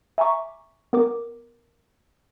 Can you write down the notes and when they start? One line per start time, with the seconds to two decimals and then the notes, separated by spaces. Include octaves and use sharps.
0.18 E5 G#5 A#5 C#6 D6
0.93 B3 A#4 D6